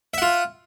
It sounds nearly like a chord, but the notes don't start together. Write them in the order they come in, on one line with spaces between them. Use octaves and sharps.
E5 F#5 F4